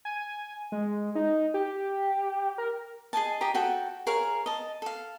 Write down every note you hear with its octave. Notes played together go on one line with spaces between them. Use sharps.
G#5
G#3
D#4
G4
A#4
G#4 D#5 G#5 A5
G4 D#5 G#5 A#5
F#4 A4 G5
G#4 A#4 C#5 F5
D#5 A5
A4 F5